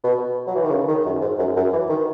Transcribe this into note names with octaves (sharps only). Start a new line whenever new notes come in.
B2
F#3
E3
D#3
C#3
D#3
F#2
G#2
F#2
F#2
E3
D#3